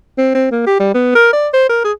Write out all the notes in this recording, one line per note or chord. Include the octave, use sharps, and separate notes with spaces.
C4
C4
A#3
G4
G3
B3
A#4
D5
C5
A#4
G#4